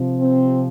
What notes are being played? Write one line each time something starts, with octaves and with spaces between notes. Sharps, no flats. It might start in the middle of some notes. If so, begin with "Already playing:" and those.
Already playing: C3 F3
C4